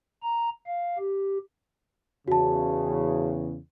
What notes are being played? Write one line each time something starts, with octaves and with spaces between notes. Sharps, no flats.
A#5
F5
G4
E2 C#3 F#4 A5